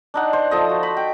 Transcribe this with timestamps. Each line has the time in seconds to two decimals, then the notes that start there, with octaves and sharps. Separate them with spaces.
0.14 D4 D#4 F#5
0.33 C5
0.51 F3 A4 D#5
0.70 F#4
0.83 B5
0.97 G5